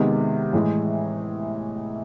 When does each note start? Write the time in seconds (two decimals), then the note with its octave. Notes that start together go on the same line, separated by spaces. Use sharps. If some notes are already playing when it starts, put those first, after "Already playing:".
Already playing: C3 D#3 G#3 B3
0.53 A2 E3 G#3